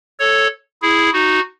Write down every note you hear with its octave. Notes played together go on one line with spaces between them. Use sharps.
A4 C#5
E4 G#4
D#4 F#4